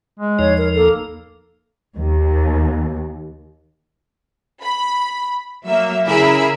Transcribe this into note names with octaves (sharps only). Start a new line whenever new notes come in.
G#3
E2 F3 D#4 C#5
A#4
A#3 A4
D#2
B5
F#3 A#3 E5
C#3 E4 G#4 A#4 E5 B5